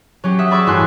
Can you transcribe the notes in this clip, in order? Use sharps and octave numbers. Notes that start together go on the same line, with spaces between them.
F#3 C#4 G4
E5 F#5 D#6
G#4 D5 B5 C#6 D6 E6
A1 G2 F#4 G#5 C6 F#6